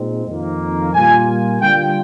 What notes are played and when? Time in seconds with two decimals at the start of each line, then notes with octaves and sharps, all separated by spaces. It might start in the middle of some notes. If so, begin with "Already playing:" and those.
Already playing: A#2 G#3 C4 D#4
0.27 F2 D#3 A#3
0.93 A#2 G3 A#3 F4 G#5
1.61 D3 G3 D4 F4 G5